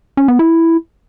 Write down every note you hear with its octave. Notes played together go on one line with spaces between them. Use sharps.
C#4
B3
E4